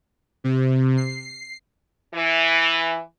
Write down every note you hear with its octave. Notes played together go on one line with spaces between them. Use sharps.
C3
C7
E3